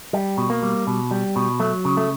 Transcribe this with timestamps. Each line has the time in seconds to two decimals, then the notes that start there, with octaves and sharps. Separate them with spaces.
0.13 G3
0.38 B2
0.50 A#3
0.63 G3
0.87 B2
1.11 G3
1.36 B2
1.60 F#3 A3
1.85 C#3
1.97 A3